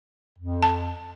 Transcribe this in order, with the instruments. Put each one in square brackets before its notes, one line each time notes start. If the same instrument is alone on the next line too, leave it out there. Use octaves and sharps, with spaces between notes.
[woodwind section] F2
[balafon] A5